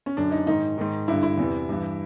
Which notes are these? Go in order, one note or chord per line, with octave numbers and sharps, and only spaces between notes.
C#4
F#2 D3 D4
D#4
G#2 D#3 D#4
G#2 D#3
G2 D3 E4
E4
E2 C3 E3
G2 E3